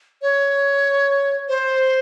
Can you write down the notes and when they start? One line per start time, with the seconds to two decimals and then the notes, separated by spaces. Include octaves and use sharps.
0.22 C#5
1.49 C5